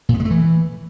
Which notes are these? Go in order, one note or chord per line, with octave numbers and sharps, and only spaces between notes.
A#2
B3
G#3
A3
E3